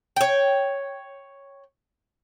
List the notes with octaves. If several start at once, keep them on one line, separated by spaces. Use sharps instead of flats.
C#5 G5